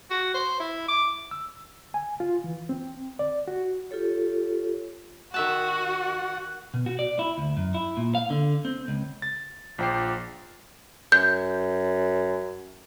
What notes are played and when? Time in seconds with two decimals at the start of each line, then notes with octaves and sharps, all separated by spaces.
0.10 F#4
0.34 C5
0.60 E4
0.88 D6
1.31 E6
1.94 G#5
2.20 F4
2.44 E3
2.69 C4
3.19 D5
3.48 F#4
3.91 F4 G4 A4 C#5
5.34 D#3 F#4 E5 F#5 A5
6.74 B2
6.86 F#4
6.99 D5
7.19 E4
7.38 D2
7.57 F#2
7.74 E4
7.97 A#2
8.15 F5
8.30 D3
8.65 C4
8.88 C#2
9.22 A6
9.78 A#1 F3 G5 D6 C7
11.12 F#2 G6